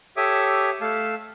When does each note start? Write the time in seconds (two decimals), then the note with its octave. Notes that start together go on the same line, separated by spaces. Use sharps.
0.17 G4 A4 C#5 E5 D6 D#6
0.81 A3 A4 F5 A5